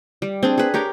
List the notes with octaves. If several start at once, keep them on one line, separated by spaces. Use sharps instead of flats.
G3
C4 D4 G#4
G#4 B4
G4 A#4 C#5